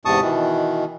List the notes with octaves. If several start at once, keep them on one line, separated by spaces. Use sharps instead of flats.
E2 G#2 C3 A5 C#6 D#6
B2 D#3 E3